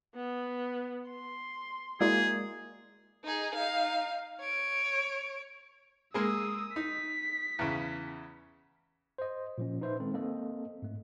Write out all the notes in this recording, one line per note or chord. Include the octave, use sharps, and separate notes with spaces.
B3
C6
G#3 A#3 E4 F#4 G#4 D5
D#4 G#4
D#4 F5
C#5 D7
G#3 A#3 G#4 D#6 E6
D#4 B6
E2 C#3
C5 D#5
A#2 F3 C#4
D#4 B4 C5 E5
D#3 G#3 C4 A4
A#3 C4 A4 D#5
G#2 A3